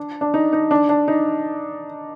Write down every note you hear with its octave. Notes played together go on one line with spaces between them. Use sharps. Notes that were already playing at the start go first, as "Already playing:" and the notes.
Already playing: D4
D4
D#4
D#4
D4
D4
D#4